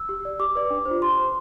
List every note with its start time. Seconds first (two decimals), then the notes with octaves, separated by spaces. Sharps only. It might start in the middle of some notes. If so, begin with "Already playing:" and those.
Already playing: E6
0.09 G4
0.25 D5
0.39 G4 D6
0.55 B4 D5
0.70 D4
0.85 C5
0.91 F4
1.01 G4 C6
1.17 C5